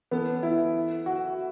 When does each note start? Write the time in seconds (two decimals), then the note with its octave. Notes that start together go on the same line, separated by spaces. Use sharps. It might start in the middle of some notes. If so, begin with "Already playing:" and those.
0.11 E3 B3 C#4 A4
0.43 E4
1.06 F#4